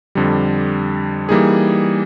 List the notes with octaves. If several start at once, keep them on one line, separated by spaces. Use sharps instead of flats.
F2 D3 G3
E3 G3 A#3 D#4 G#4